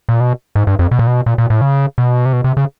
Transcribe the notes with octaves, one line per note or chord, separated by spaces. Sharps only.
A#2
B2
G#2
G2
F2
B2
A#2
B2
A#2
A#2
A2
C#3
B2
C3
B2
C3
C#3